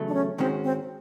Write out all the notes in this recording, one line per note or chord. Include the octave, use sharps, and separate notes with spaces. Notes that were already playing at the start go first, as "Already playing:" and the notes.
Already playing: E2 C#3 F#3 A3
D4
C#4
G#2 D#3 G#3 C4 C#4 F#4
C4